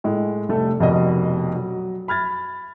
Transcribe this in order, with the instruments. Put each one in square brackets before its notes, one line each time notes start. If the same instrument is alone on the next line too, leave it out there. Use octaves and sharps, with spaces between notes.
[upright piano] A2 G#3
F1 G3 A3 A4
F1 F2 B2 A#4 D5 D#5
F#3
B5 F6 G#6 A6